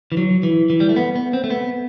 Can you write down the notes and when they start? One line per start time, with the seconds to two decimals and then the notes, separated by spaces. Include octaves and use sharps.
0.12 E3
0.17 F#3
0.43 E3
0.70 E3
0.80 G3
0.89 A3
0.96 B3
1.16 B3
1.33 C4
1.44 A3
1.50 B3